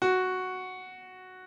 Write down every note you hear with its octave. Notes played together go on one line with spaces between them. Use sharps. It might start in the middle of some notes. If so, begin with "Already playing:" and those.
F#4